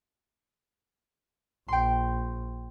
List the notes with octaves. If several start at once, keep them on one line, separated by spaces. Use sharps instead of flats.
A#1 G5 C6